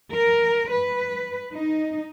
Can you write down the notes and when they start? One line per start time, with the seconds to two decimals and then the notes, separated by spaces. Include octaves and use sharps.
0.13 A#4
0.72 B4
1.54 D#4